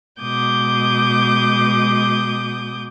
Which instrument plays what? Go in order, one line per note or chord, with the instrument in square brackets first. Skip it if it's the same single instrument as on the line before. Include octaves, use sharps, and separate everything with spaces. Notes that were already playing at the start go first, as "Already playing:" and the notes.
[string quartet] B2 G#3 D6 D#6 G6